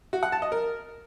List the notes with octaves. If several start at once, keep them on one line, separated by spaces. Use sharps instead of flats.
F#4
F#5
A5
D#5
A#4